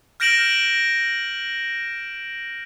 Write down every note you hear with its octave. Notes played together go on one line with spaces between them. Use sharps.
F6 G6 A#6 D7 E7 F#7